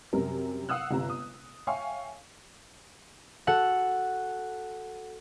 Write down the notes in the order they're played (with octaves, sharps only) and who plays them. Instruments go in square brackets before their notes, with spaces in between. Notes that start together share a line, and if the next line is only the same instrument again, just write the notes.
[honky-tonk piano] F#2 C3 G3 A#4
F5 F#5 D#6 E6 F#6
G1 C3 A#5
D#6
C#5 E5 F5 G5 G#5 C#6
[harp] F#4 A4 F#5